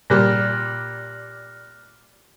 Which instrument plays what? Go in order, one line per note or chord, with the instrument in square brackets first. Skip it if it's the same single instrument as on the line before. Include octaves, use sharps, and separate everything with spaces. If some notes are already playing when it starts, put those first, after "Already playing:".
[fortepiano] A#2 G3 [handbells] F6 F#6 A#6